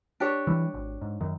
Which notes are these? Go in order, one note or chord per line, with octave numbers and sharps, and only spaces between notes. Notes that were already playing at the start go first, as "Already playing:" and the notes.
D4 G4 C#5
E3 G3
G#1
G#2
F#2 D#3